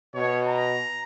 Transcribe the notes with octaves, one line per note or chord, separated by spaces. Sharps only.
B2 C#5
A#5